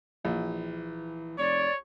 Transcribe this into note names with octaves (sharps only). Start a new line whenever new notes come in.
A#1 E3
F1 C#5 D5